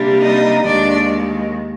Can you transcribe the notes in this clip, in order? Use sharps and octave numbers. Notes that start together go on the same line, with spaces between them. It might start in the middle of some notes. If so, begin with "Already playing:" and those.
Already playing: C3 G3 A#3 D4
D#4 D#5
D#2 D#3 G#3 D4 D5